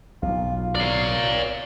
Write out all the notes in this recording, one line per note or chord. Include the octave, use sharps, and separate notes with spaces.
B1 F4
F#3 D5 F5